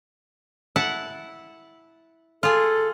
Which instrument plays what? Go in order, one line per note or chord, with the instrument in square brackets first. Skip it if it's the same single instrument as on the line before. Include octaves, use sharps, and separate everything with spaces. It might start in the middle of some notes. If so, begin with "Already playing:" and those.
[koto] E4 F#5 A5
[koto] F4 G#4 [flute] A4